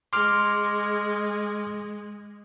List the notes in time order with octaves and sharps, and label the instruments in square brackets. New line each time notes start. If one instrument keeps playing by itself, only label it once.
[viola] G#3 [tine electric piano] C6 D6 F6